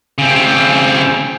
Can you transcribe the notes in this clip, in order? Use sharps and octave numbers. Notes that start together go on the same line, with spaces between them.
C#3 C4